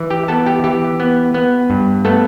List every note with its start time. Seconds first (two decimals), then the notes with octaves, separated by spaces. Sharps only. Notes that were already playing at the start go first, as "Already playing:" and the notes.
Already playing: E3
0.10 G4 G5
0.28 B3 A4 A5
0.46 G4 G5
0.64 E3 G4
1.00 B3
1.34 B3
1.70 G2
2.05 A3 B3 A4